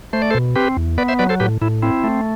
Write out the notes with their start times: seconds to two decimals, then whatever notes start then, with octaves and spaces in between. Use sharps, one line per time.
0.13 A3 C5
0.22 D5
0.31 A4 C5
0.35 B2
0.56 C4 G4 B4
0.77 E2
0.98 B3 B4 D5
1.08 C5 E5
1.19 F#3 B4 D5
1.29 A4 C5
1.40 A2 G4 B4
1.62 A2 E4
1.82 C4 E4
2.04 A3